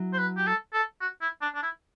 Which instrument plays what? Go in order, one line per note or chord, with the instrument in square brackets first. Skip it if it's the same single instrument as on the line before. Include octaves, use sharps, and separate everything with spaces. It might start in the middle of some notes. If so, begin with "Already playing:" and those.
Already playing: [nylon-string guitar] F#3 E4
[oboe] C5
B4
G4
A4
A4
F#4
E4
D4
D4
E4